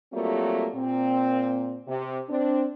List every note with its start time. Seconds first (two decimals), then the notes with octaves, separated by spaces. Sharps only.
0.13 F#3 G3 A3 A#3 C4 F4
0.75 A#2 C4
1.87 C3
2.29 C4 D4